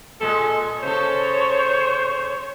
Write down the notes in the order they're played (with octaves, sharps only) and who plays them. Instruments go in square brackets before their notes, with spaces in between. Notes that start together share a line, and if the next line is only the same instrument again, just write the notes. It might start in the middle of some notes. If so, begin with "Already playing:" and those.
[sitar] A#2 G#3 [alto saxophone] A4
[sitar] C#3 A4 [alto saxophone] C5 [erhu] C#5